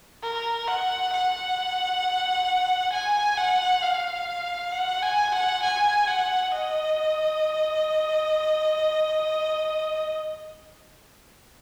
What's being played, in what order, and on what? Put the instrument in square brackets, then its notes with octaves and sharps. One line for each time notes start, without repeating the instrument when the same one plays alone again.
[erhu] A#4
F#5
F#5
G#5
F#5
F5
F#5
G#5
F#5
G#5
F#5
D#5